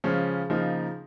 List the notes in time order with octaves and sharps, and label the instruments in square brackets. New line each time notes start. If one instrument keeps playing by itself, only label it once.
[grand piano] C#3 F3 G#3 C#4
C#3 F3 A#3 D#4